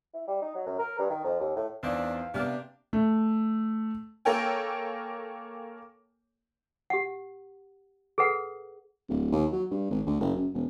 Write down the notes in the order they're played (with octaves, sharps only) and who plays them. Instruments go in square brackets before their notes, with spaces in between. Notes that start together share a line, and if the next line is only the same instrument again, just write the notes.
[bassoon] E4
G3
D#4
F#3
F#2
A#4
G2
D#3
F2
D#2
A2
[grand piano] E2 C4 D#4 [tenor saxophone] D4 [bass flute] F5
[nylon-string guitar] C3 A#3 B3 [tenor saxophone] D4 [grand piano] G4 D6 F6
[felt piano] A3
[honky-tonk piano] A#3 A4 A#4 C#5 G5 G#5
[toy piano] G4 F#5
G#4 A4 B4 F#5
[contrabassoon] D1
D#2
F#3
G2
G#1
D2
F#1
F#2
E1